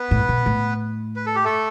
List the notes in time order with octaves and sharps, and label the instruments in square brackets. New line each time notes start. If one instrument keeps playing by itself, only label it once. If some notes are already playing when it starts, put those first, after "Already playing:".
Already playing: [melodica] B3 B4
[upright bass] A2
B2
A2
[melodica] B4
A4
G4
A3 A4